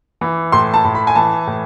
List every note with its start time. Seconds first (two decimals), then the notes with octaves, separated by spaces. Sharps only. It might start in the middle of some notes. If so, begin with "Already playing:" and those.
0.21 E3
0.52 A2 C6
0.74 A5
0.84 A2
0.95 B5
1.07 G#5
1.15 E3 A5
1.47 A2